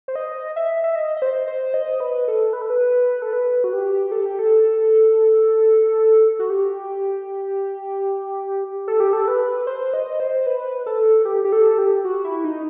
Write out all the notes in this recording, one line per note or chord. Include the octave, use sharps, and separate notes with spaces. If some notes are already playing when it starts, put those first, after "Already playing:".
C5
D#5
E5
E5
D#5
D#5
C5
C5
D#5
B4
A4
B4
A4
B4
A4
B4
F#4
G4
A4
G4
A4
F#4
G4
A4
G4
A4
B4
C5
D#5
C5
B4
A4
G4
G4
A4
G4
F#4
E4
D#4